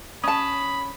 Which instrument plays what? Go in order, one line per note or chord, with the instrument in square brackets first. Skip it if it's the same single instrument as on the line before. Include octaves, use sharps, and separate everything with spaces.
[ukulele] C#4 A5 [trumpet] B5 [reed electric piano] D#6